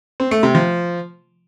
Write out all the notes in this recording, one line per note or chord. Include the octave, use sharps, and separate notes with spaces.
C4
A3
C3
F3